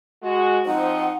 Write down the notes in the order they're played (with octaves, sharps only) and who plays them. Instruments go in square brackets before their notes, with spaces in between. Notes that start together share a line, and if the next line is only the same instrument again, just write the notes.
[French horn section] G#3 F#4
[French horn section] F3 C4 D#4 [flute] F#5